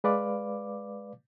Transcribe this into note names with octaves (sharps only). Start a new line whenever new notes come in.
G#3 B4 D5 F5 D6